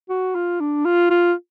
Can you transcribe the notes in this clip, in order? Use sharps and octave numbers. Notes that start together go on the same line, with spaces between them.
F#4
F4
D4
F4
F4